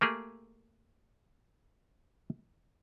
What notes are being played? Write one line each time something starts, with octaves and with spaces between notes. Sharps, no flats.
A3 A#3 G4 G#4